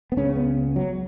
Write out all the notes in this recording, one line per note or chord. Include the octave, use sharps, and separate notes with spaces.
B3
C#2 C#3 C#4
B3
F#3